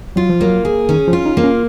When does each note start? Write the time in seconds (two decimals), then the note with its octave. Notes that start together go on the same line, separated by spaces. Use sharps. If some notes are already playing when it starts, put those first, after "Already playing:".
0.16 F#3 F4
0.29 F3
0.41 F#3 A#3
0.65 G#4
0.89 D#3 C#4
1.07 F3
1.13 F4
1.26 D#4
1.37 A#3
1.44 C#4